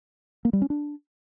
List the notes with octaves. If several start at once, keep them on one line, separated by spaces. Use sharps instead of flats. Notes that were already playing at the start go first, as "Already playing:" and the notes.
A#3
G3
C#4
D4